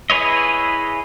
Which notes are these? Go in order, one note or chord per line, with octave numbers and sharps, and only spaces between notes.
E4 G#4 B4 C#5 D#5